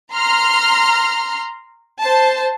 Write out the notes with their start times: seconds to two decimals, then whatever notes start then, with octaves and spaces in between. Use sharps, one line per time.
0.13 A#5 C6 F6
2.00 C5 A5